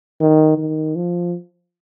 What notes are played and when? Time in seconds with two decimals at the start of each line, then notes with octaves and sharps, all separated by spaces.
0.20 D#3
0.58 D#3
0.96 F3